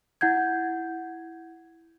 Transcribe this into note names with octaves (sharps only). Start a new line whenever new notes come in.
E4 F#5 G6 G#6